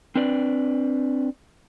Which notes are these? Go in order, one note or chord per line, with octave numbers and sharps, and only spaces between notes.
C4 D4 B4 D5